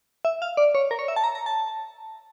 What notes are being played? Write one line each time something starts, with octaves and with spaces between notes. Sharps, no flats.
E5
F5
D5
C#5
A#4
C#5
E5
A5
A#5
A#5
A5